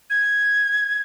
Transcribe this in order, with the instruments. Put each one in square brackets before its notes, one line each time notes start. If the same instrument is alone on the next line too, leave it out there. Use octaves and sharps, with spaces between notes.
[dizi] G#6